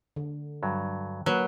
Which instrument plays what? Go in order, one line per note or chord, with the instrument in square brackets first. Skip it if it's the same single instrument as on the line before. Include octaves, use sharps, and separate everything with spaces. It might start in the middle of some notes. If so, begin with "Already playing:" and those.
[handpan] D3
[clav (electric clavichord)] G2 F#3
[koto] F#3 [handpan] A#3 B4